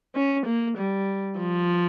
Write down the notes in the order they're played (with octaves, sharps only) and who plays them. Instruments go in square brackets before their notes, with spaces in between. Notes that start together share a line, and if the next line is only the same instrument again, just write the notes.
[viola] C#4
A#3
G3
F3